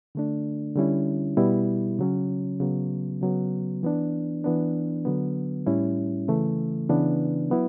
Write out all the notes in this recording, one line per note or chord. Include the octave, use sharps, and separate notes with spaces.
D3 A3 D4
D3 G3 C#4 E4
B2 G3 B3 E4
C#3 F#3 C#4
C#3 F#3 B3
C#3 F#3 B3
E3 B3 D4
E3 B3 D4
D3 F#3 B3
A2 G3 C#4 E4
C#3 E3 A3
C#3 E3 B3 D4
F#3 B3 E4